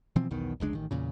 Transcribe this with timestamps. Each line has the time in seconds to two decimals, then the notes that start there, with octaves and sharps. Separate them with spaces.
0.16 B2 E3 F3 C4
0.31 B1 E2 B2 D#3
0.60 F1 C#2 G#3 D4
0.73 A1 D#3
0.91 E2 A#2 C#3